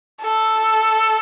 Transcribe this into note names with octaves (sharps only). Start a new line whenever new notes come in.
A4